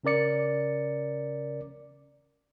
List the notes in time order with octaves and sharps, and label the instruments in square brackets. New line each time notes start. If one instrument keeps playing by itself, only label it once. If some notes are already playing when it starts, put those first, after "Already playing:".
[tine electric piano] C#3 C#4 A#4 D5 C#7